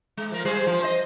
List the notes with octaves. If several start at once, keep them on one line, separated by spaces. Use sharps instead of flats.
G#3
F3 A#4
G3 G#4 C5
F3
C5 D#5